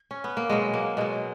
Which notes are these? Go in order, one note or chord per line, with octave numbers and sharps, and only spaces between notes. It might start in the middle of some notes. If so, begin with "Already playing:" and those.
Already playing: D#4
C#4
B3
A#3
B2 F#3 G#3
A#3
B2 F#3 G#3